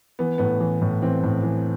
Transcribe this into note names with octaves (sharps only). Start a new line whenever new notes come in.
E3 B3
A2 B3
E3
A2
E3 C4
A2
E3